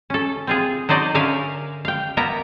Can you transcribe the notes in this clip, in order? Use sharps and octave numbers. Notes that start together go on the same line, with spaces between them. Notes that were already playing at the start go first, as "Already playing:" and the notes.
C#4 A4
C4 F4 G#4
F#3 D#4 C5 D5 D#5
D3 C#4 A#4 E5 F5 G#5
F5 G5
A#3 B3 A#4 E5 A#5